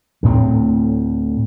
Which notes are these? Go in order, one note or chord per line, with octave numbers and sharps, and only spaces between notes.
D2 A2 B3 C4